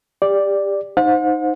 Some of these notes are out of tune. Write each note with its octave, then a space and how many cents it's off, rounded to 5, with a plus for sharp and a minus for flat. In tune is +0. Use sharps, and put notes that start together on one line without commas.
G4 +25 D5 +0
D#4 +0 C5 +0 F#5 -45